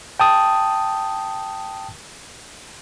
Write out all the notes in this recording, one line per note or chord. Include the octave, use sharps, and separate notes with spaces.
G5 A5 D#6